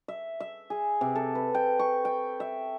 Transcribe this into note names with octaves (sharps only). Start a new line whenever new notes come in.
E5
E5
G#4
C3
A4
B4
G5
C#6
G5
E5